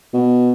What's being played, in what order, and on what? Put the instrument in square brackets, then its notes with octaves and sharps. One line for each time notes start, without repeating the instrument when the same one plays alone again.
[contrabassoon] B2